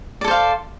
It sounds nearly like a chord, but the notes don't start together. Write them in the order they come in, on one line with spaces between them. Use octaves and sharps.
D5 A4 C5 F5